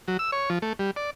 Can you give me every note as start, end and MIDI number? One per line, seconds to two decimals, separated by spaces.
0.08 0.17 54
0.19 0.31 88
0.32 0.50 73
0.50 0.59 53
0.62 0.73 57
0.79 0.91 55
0.96 1.10 74